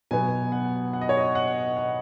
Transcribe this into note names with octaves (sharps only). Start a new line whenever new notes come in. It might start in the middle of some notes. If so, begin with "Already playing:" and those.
B2 F#3 B3 G#5
F#5
F#5
D#5
C#5
D#5
F#5
F#5